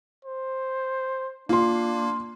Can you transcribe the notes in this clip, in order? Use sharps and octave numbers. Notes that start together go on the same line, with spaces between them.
C5
A#3 D4 F4 C6